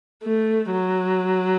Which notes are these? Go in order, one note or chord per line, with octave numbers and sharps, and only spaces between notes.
A3
F#3